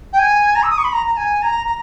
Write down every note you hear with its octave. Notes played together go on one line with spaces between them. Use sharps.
G5
G#5
A#5
E6
D#6
C#6
B5
A#5
A#5
G#5
A#5
A#5